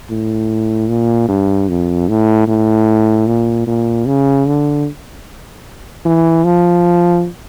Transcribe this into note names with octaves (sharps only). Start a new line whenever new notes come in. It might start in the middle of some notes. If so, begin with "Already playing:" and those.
A2
A#2
G2
F2
A2
A2
A#2
A#2
C#3
D3
E3
F3